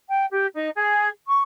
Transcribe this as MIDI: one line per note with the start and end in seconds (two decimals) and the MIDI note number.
0.08 0.25 79
0.30 0.46 67
0.54 0.68 63
0.75 1.08 68
1.26 1.42 85